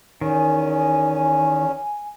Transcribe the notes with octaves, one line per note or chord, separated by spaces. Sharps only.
E2 D#3 C#4 G#5